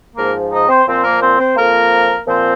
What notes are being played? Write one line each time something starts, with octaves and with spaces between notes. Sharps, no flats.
G#2 F3 A#3 A#4
D#4 D#5
C4 C5
A#2 F3 C4 C5
A#3 A#4
C4 C5
C4 C5
F2 F3 A#3 A#4
A#2 F3 C4 C5